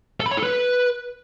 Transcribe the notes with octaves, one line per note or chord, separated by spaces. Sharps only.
A4
B5
C#5
A4
B4